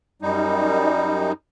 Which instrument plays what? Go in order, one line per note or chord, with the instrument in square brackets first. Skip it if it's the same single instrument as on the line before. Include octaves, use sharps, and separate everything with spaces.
[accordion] F#2 G3 D#4